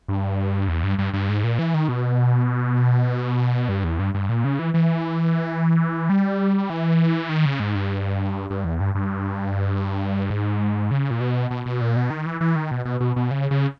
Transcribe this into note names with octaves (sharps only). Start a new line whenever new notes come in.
G2
E2
G2
G2
G2
G#2
A#2
E3
D#3
B2
G2
E2
G2
G2
A#2
C#3
E3
E3
G3
E3
D#3
C#3
G#2
G2
G2
E2
G2
G2
G#2
C#3
A#2
B2
B2
B2
A#2
B2
D#3
E3
E3
D#3
B2
B2
B2
B2
C#3
C#3